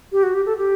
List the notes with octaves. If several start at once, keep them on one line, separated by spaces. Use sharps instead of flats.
G4
F#4
G4
A4
G4